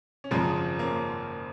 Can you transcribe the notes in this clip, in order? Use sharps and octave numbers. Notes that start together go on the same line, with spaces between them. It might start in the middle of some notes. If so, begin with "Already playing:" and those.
C#4
G#1 F#2 C#3 F3 G#3 C4
A#3 C#4